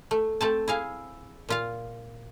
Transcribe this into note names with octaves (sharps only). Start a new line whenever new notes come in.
A3
A3 C4 A5
E4 G#4 F5
A#2 F4 F5